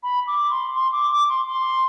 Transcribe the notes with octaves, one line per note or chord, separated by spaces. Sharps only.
B5
D6
C6
C6
D6
D6
C6
C6